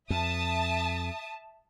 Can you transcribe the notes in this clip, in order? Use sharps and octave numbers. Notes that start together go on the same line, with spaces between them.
F2 E5 A5 D#6